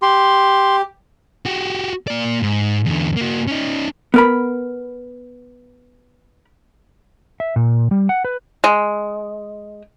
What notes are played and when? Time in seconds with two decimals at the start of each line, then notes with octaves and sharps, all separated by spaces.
0.02 G4 C6
1.46 F#4 G4
2.07 A#3 D5
2.42 G#2
2.86 E2 D3
3.17 A#3 F#4
3.47 C#4 D#4
4.14 B3 A#4 B5
7.40 E5
7.56 A#2
7.91 G3
8.09 F#5
8.25 B4
8.64 G#3